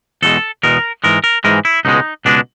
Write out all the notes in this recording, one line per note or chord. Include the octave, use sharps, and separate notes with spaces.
E2 B2 G#3 A4
E2 B2 G#3 A#4
G#2 E3 G#3 A#4
A#4
G#2 E3 G#3 A#4
E4
C#2 B2 G#3 D#4
C#2 B2 G#3 D4